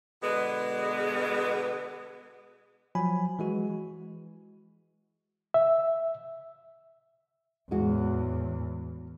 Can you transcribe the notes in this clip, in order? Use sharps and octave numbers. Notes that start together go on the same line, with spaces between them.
B2 D3 G#3 B3
F3 F#3 G#5 B5
E3 G#3 F#4
E5
E2 A2 G#3 F#4